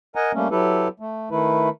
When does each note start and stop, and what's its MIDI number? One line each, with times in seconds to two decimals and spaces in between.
0.16 0.32 70
0.16 0.32 75
0.16 0.32 78
0.16 0.32 80
0.16 0.32 82
0.34 0.48 55
0.34 0.48 57
0.34 0.48 58
0.34 0.48 61
0.51 0.88 54
0.51 0.88 64
0.51 0.88 67
0.51 0.88 69
0.51 0.88 71
1.00 1.29 57
1.31 1.69 51
1.31 1.69 57
1.31 1.69 64
1.31 1.69 71